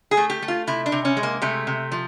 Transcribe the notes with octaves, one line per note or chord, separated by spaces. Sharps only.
G#4
A3
G4
A3
F4
C3 E4
D4
C3
C#4
G#3
A#3
C3 A3
C3
F3